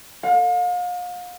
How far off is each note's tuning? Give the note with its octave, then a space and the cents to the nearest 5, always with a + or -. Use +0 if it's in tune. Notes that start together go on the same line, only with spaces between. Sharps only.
F5 +40